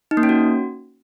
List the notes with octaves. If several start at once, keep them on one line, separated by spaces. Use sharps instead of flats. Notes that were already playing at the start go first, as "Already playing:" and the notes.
D#4
A#3
C#4
F#4